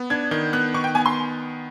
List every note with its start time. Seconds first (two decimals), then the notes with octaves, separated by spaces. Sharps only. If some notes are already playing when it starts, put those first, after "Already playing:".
Already playing: B3
0.10 D4 G#6
0.31 D#3 G6
0.53 B3 F#6
0.74 D#3 C#6
0.84 G5
0.95 B3 G#5
1.06 C6